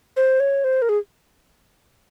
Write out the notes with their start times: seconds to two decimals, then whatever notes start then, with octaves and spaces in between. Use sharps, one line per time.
0.17 C5
0.40 C#5
0.64 C5
0.82 A#4
0.89 G#4